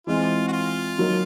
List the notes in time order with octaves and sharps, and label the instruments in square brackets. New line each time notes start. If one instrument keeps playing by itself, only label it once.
[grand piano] E3 G#3 C4 [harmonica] F4
[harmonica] F#4
F4
[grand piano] D#3 F#3 A#3 D#4